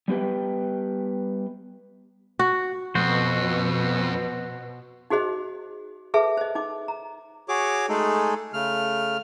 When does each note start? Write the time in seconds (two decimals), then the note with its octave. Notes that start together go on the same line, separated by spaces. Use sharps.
0.08 G3 B3 G4 B4 G5
2.39 F#4
2.95 F2 B2 F#4 C5
5.10 D#4 F#4 G#4 C5 D#5
6.14 G#4 A4 B4 E5 A5
6.37 C5 D#5
6.55 D#4 D6
6.88 A#5
7.49 F#4 G#4 C#5 D6
7.89 G#3 A3 D#4 G#4 A4
8.53 C#3 A3 F6